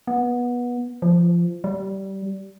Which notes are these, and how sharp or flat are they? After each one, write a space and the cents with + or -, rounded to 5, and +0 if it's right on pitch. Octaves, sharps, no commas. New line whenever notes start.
B3 -20
F3 -20
G3 -20